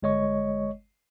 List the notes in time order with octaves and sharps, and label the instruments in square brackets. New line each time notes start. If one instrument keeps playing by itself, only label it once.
[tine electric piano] G1 G#3 C#5 D#5 C#6